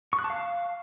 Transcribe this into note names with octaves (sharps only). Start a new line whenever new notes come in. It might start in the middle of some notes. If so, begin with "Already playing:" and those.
C#6
F#6
A5
F5